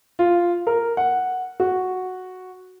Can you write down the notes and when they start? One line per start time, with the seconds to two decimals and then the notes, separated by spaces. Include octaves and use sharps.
0.19 F4
0.67 A#4
0.97 F#5
1.60 F#4